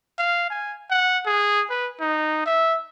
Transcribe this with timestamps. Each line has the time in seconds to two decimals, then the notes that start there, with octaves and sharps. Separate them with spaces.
0.18 F5
0.50 G#5
0.90 F#5
1.26 G#4
1.70 B4
2.00 D#4
2.46 E5